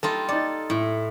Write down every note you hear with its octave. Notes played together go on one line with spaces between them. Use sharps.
G3 D#4 F4 A4
D#4 A4 D5
A2 E4